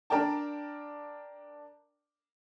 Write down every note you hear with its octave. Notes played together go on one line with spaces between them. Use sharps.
D4 A#4 D5 G5 A5